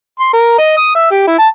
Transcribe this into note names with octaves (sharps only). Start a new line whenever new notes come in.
C6
A#4
D#5
D#6
E5
G4
E4
A5